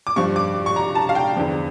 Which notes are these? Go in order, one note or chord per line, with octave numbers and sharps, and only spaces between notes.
D6
G2 F3 C#6
D6
C#6
A#5
A5
F5
G5
E2 D3 F3